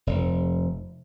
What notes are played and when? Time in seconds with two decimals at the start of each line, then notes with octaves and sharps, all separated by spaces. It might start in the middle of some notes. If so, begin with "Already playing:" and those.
0.07 F1